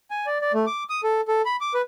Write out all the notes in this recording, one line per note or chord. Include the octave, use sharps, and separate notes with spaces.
G#5
D5
D5
A3
D6
D#6
A4
A4
B5
D6
B4